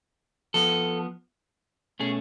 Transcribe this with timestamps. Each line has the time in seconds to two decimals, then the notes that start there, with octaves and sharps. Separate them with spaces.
0.54 F3 B3 A4
2.00 B2 A3 C#4 G#4